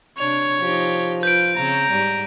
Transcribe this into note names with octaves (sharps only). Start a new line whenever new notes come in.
C3 D4 C#5 F7
F3 D#4 G4
F4 B4 G6 D7
C#3 C4 C#5 A#5
G#2 G3